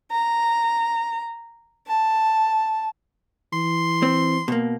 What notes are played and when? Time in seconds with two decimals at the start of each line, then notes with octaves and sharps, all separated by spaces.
0.11 A#5
1.87 A5
3.53 E3 C6
4.03 C4
4.48 B2 A#3